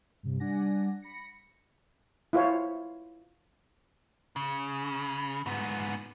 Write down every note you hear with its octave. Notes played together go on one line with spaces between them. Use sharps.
G2 C3
G3 D4 D5 F#5 G#5 A#6
B5 A#6 C#7
E4 F4 C5 C#5
C#3
G#2 B3